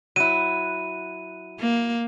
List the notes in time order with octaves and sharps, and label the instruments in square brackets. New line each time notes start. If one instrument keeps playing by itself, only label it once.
[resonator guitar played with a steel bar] F#3 E4 [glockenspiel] D#7
[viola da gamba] A#3